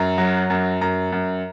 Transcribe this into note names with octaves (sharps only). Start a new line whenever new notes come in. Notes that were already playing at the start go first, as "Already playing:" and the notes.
Already playing: F#2 A#5
F#3
F#2
F#2 A#5
F#2